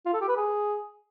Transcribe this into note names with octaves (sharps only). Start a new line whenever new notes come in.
F4
A4
G4
B4
G#4